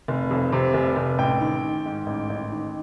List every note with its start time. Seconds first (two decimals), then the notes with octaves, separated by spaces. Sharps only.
0.08 F1
0.31 F2
0.52 C3
0.74 F1
0.96 F1
1.18 A1 G5
1.41 D#3
1.63 D#3
1.85 G#2
2.06 A1
2.30 A1
2.52 D#3